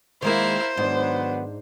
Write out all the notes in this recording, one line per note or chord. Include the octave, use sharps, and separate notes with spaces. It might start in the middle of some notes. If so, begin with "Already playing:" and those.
D#3 G#3 A#3 E4 A#4 C5 F5
G#2 D#3 F#3 B3 D4